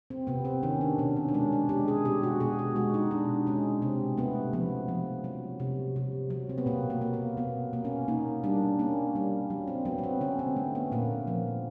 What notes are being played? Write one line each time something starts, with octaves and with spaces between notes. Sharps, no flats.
C4
C3 B3
C4
D#3 C#4
D4
B2 C#4
C#4
D4
G#3 C#4
D4
G#3 G4
G#4
B2 G4
F#4
B2 G#4
F#4
G#3 F#4
D#4
B2 D4
G#3 C#4
C3 C4
A3 B3
F3 B3
F3
F#3
C3
C3
F#3
C4
B3
B2 A#3
A#3
A#3
A#3
B2 B3
A#3
C#4
A#3 D#4
G3 D4
A#3 C#4
G3
F#3
C4
F#3 B3
B3
C4
D3 C#4
C4
A3
B3
A#2 A#3
F3